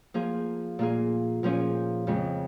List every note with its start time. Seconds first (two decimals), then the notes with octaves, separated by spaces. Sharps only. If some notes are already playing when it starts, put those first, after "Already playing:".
0.14 F3 A#3 F4 G#4
0.79 A#2 A#3 F4 G#4
1.43 A#2 F3 C#4 G#4
2.07 F2 C#3 G#3